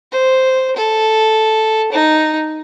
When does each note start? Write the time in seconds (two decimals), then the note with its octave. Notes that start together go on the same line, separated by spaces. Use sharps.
0.12 C5
0.76 A4
1.92 D#4